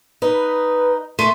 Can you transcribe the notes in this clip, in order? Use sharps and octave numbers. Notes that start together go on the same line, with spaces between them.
D#4 B4
A3 C6